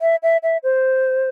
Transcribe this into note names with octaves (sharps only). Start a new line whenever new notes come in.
E5
E5
E5
C5